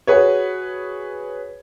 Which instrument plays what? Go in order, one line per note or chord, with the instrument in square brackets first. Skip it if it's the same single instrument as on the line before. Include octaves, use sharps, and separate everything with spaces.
[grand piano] F#4 G#4 B4 C#5